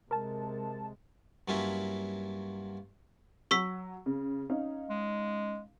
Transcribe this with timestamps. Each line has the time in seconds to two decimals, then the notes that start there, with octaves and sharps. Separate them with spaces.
0.11 C3 G#3 A#4 A5
1.48 G2 F#3 A#3 C#4 E4 F4
3.51 F#3 C#6 E6 B6
4.06 C#3
4.50 C#4 D#4 F5
4.90 G#3